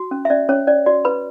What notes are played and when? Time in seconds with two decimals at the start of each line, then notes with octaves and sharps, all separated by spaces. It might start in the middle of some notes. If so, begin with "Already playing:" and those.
Already playing: F#4
0.11 C#4
0.25 E5
0.30 C#4 D5
0.49 C#4 C#5
0.67 C#4 D5
0.86 F#4 D5
1.05 B4 B5